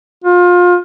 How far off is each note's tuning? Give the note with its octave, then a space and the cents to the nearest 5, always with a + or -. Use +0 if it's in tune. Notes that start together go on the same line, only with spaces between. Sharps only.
F4 +30